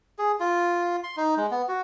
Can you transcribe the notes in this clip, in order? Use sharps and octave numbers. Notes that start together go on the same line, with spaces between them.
G#4
F4
C6
D#4
G#3
B3
F#4